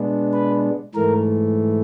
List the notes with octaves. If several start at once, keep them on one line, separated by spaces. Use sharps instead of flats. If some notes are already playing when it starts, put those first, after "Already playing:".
Already playing: B2 G#3 B3 D4
B4
G#2 E3 A3 A#4